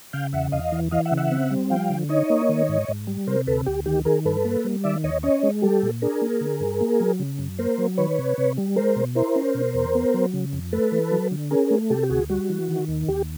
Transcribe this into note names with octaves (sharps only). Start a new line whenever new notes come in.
C#3 F5 G5
E2 E5 F#5
E2 D#5 F5
E3
E3 D#5 F5
E5 F#5
C#3
E5 F#5
C4
G3
F3 F5 G5
D3
D#4 C#5 D#5
A#3
D#3
G#2
G#2
G3
C3 A#4 C5
D2 A4 B4
D2 G4
D#3 G4
D#3 G#4 A#4
G2 A4 B4
A#3
G3
D#3 D5 E5
D#2 C#5 D#5
C#4 C#5 D#5
G#3
G3 G4 A4
A#2
D4 G#4 A#4
A#3
D3
G2
A#3
F#3
C#3
F#2
A#3 A#4 C5
F#3
D#3 B4 C#5
C3
C3
G3
G#3 A#4 C5
B2
E4 A#4 C5
C#4
B2
E2
B3
F#3
C#3
F2
A3 A4 B4
E3
F#3
D3
C#4 G#4 A#4
A3
C3 G4 A4
G4
D2 F#4 G#4
G3 F#4
E3
D#3
D#2
D#2 G4